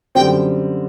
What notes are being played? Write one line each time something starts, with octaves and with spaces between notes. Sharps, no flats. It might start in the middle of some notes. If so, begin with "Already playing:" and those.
F#2 D3 G3 C4 G5